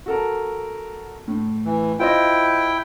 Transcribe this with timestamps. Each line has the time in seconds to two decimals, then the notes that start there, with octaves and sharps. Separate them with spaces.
0.06 F#4 A4 A#4
1.28 A2
1.65 E3
1.99 E4 F4 C5 D#5 G5